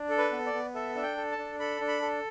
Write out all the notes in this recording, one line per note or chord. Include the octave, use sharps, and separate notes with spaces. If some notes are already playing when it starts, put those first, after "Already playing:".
Already playing: D4
A4
B4
B3
D5
B3
A4 E5
D4 E5
G5
A4
A5
D4
A4 B5
D4
B5
A4